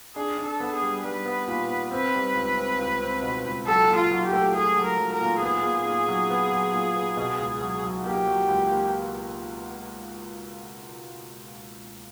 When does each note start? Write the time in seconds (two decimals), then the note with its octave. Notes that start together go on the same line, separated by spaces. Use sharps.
0.16 D4 G#4
0.38 D4
0.46 A4
0.60 B3
0.75 G#4
0.82 G3
1.04 G3 B4
1.26 B3
1.48 A#2
1.69 B3
1.91 C4 B4
2.14 G3
2.35 C#2
2.57 C4
2.79 C#2
3.00 C4
3.22 B2
3.45 C#2
3.67 F#3 A4
3.88 A#2
3.96 F4
4.11 F#3
4.25 G4
4.33 A3
4.55 A3 G#4
4.76 F#3
4.84 A#4
4.98 F#3
5.13 A#4
5.21 A#2
5.42 B3 G#4
5.63 A#2
5.86 A#2
6.08 F#3
6.30 B3
6.51 F#3
6.73 A#2
6.96 B3
7.17 B2
7.39 C#2
7.61 F#3
7.84 F#3
8.05 A#3 G4
8.27 F#3
8.48 C#2
8.71 A#3